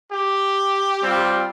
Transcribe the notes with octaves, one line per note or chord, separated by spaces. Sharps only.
G4
G3 C4 F4